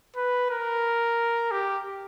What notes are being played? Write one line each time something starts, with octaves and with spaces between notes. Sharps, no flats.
B4
A#4
G4